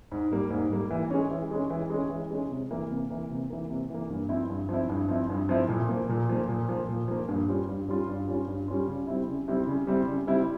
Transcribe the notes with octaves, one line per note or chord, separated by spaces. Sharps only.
G#2
G3 A#3
G#2
G3 A#3
E3
G#3 C#4
E3
G#3 C#4
E3
G#3 C#4
E3
G#3 C#4
C3
E3 A#3
C3
E3 A#3
C3
E3 A#3
C3
E3 A#3
G2
F3 C4 E4
G2
F3 C4 E4
G2
F3 C4 E4
G2
F3 C4 E4
A#2
F3 A#3
A#2
F3 A#3
A#2
F3 A#3
A#2
F3 A#3
G2
G3 C#4 F4
G2
G3 C#4 F4
G2
G3 C#4 F4
G2
G3 C#4 F4
C#3
G3 C4 E4
C#3
G3 C4 E4
C#3
G3 C4 E4
C#3
G3 C4 E4